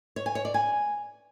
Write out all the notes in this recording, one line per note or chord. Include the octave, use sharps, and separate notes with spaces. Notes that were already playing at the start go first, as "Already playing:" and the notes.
C#5
G#5
C#5
D5
G#5